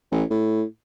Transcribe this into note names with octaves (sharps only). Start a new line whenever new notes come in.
A1
A2